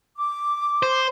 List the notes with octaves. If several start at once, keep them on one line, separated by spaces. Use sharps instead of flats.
D6
C5